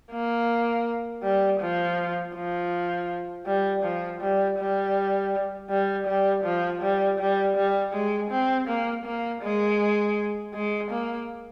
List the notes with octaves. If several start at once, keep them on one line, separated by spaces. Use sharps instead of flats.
A#3
G3
F3
F3
G3
F3
G3
G3
G3
G3
F3
G3
G3
G3
G#3
C4
A#3
A#3
G#3
G#3
A#3